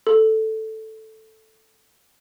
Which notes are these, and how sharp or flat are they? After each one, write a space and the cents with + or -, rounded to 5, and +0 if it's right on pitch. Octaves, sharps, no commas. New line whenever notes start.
A4 +0